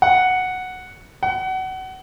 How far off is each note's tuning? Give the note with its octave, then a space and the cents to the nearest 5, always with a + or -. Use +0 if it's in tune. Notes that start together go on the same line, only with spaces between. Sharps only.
F#5 -5
F#5 +25